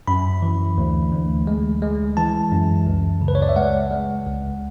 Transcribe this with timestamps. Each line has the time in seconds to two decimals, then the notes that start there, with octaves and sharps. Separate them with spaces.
0.07 F#2 B5
0.42 E3
0.78 D2
1.12 D2
1.47 G#3
1.82 G#3
2.17 E3 A5
2.52 F#2
2.87 C#2
3.21 C#3
3.28 B4
3.35 C#5
3.42 D5
3.49 E5
3.56 G#3 F#5
3.91 G#3
4.26 C#2